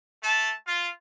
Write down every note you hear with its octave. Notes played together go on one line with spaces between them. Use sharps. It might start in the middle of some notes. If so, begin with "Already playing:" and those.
A3 A5
F4